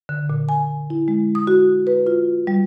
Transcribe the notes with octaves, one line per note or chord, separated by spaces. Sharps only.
D3
A#2
G#5
E4
G#3
D#6
F#4
B4
F4
G3